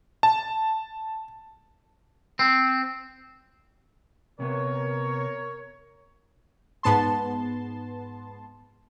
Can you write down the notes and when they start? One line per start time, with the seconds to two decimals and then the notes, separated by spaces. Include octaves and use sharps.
0.23 A5
2.39 C4
4.40 C3 B3 A#4 C#5
6.83 G#2 B3 A5 C6